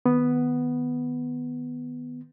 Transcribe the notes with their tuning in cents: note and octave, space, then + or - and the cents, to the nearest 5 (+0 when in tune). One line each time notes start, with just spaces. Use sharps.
D#3 -10 B3 +0